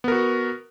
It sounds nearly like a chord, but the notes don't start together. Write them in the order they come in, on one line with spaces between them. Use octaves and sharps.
B3 A#4 F#4